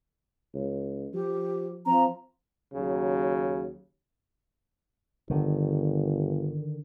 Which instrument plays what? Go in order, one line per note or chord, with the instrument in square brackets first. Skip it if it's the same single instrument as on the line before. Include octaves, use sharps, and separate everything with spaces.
[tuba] C#2
[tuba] F3 [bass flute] G4
[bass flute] F3 [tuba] C4 [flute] A#5
[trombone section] D#2 C#3 F#3
[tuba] G1 [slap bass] D3 D#3